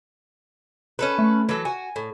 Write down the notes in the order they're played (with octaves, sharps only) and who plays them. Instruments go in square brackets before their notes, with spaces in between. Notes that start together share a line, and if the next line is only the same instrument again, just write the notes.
[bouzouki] C#4 A4 B4
[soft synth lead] A3
[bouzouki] E3 F#3 A4
[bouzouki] F#4 [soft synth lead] G#5
[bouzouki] A2